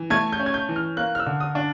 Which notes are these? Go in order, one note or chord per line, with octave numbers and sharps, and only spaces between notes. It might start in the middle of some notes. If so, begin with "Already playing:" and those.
Already playing: E3
A3 G#6
G6
C#4
G#6
G6
E3
F6
A#3 F#6
F6
E6
D3
D#6
D4